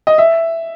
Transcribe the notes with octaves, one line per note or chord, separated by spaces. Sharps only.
D#5
E5